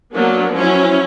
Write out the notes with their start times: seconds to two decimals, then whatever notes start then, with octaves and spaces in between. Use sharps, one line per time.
0.13 F#3 A#3 B3 D4
0.54 F3 F#3 C#4 E4